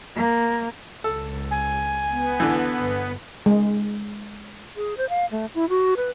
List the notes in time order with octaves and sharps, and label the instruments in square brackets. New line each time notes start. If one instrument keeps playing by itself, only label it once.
[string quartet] A#3
[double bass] C#2 [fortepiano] A4
[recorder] G#5
[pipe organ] B3
[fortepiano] D3 E3
[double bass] G1
[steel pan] G#3
[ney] G#4
C5
F5
A3
E4
F#4
B4